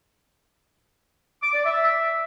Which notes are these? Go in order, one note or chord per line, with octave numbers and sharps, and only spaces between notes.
D6
D5
E5